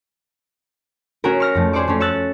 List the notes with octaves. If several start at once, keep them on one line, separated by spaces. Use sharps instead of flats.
C#4 F#4 G#4 A#4
C#6 F6 A#6
F2 A3
G#4 C5 D5 C#6 D6
A3 C#4
C#6 E6 F#6 A6